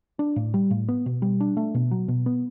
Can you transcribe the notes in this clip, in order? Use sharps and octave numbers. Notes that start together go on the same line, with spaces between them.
D4
A2
G3
A2
B3
B2
G3
D4
A3
B2
F#3
B2
B3